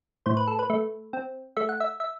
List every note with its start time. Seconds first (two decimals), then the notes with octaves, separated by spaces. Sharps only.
0.26 A2 C5
0.37 B4
0.47 A4
0.59 B4
0.70 A3
1.13 C4
1.57 A3 E5
1.69 F#5
1.80 E5
2.00 E5